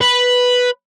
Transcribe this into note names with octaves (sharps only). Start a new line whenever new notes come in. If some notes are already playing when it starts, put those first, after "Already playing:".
B4